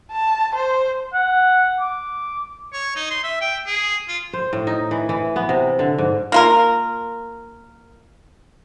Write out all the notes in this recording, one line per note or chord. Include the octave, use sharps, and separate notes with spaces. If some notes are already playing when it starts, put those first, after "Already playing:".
A5
C5
F#5
D6
C#5
D#4
C6
E5
G5
G#4
F4
C5
A2
D#4
E3
E3
B3
C3
D3
G#2
A#3 F4 A#4